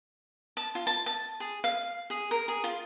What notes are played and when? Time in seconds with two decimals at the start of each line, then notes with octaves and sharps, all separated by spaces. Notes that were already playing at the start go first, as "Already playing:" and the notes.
0.57 A5
0.75 F4
0.87 A5
1.06 A5
1.40 G#4
1.64 F5
2.10 G#4
2.31 A#4
2.48 G#4
2.64 F4